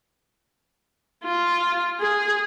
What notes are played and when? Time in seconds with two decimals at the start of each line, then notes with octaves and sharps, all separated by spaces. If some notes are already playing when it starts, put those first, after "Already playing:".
1.24 F4
2.00 G#4